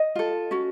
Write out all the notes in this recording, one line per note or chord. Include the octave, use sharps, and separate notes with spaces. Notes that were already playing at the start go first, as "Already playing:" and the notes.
Already playing: D#5
F4 A4
C#4 F#4